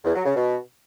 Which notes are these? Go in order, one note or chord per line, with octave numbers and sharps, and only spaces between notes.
E2
F#3
C#3
B2